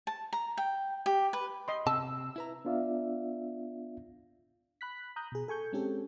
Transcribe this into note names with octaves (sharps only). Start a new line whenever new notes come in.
A5
A#5
G5
G4
B4
D#5 B5 C6
C3 A5 E6
E4 B4 A#5
B3 D4 F4 D5 E5 F5
B5 F#6 B6
A#5 D#6 F#6 G6
B2 G#4
A4 G#5 C#6 G6
G#3 C4 C#4 G4 A4